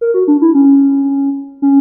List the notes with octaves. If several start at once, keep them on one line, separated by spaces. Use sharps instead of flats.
A#4
F#4
D4
E4
C#4
C#4